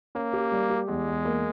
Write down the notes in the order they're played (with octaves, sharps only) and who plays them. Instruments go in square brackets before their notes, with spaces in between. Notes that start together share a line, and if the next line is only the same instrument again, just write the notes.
[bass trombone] A#3 [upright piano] C#4
[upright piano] G4
G3
G4
[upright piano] E2 [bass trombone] G#3
[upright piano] E2
A#3